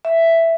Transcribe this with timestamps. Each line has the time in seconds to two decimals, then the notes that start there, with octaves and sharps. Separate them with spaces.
0.05 E5